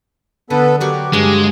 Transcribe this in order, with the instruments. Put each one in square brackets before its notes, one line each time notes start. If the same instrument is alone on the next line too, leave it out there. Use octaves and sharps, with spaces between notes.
[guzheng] D3 [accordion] B3 A4 B4
[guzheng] F#3 F#4 A#4 [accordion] G4
[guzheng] G2 F#3 A#3 [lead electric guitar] G#3